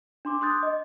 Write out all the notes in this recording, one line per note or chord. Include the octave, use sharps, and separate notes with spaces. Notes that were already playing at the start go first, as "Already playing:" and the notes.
D4 C6 D6
C6 D6 D#6 F#6 G6 A6
D#5